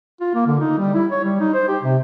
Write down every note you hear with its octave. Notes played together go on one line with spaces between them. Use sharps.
F4
A#3
D3
D#4
G3
E4
C#5
G3
D#4
C5
G4
C3